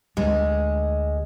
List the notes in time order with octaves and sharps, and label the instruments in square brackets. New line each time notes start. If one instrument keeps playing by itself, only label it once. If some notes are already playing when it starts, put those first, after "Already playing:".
[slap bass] D2 [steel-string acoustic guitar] G#3